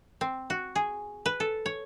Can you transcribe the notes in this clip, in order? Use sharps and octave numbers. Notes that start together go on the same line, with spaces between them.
C4
F#4
G#4
B4
A4
C#5